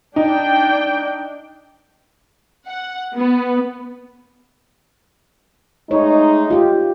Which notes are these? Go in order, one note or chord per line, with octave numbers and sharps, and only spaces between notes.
D4 D#4 G5
F#5
B3
G#3 A3 D#4 C#5
F4 G4